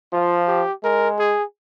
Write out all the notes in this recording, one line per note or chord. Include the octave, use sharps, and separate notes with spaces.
F3 F4
G4
G#3 A#4
G#4